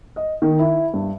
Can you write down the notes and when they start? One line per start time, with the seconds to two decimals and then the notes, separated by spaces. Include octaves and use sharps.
0.16 D#5
0.42 D#3
0.59 E4
0.94 G2